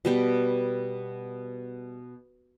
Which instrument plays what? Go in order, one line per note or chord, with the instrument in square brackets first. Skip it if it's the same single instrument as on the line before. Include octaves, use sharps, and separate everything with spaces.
[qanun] B2 G3 G5